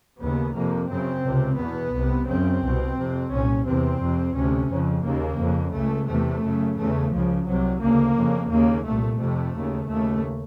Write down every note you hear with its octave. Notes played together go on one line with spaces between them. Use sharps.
D#2 C#3 B3
F2 C3 A#3
F#2 C#3 C4
C#2 C3
E2 B2 B3
C2 C3
F#2 C#3 C4
C2 B2
F2 C3
C2 A#2 C#4
E2 C3 C4
F2 C3
D2 C3 C#4
F2 C#3
D#2 C#3 A#3
F2 C#3
C#2 C#3 A3
E2 C3 A3
F#2 C#3
E2 C#3 A3
C#2 C#3 F3
C2 C3 F#3
D2 C#3 A#3
F2 C#3
D#2 C#3 A#3
C2 A#2 A3
F2 C3 A3
D#2 C#3
D#2 C#3 A3